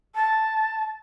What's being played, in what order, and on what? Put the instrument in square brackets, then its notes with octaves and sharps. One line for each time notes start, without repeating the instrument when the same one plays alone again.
[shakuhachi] A5